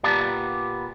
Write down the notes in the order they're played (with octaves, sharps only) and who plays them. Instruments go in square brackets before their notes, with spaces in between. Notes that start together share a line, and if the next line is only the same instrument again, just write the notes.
[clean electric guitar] A#2 B3 G4 D5 A5